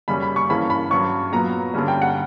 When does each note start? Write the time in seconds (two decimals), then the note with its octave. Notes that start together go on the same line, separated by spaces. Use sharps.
0.08 F#2 C#3 G3 C#4 B5
0.22 B5
0.36 C#6
0.49 G2 E3 A#3 C#4 B5
0.70 B5
0.90 G2 F#3 C#4 C#6
1.32 A#2 F#3 B3 A#5
1.74 G2 D3 G3 C#4
1.88 G5
2.02 F#5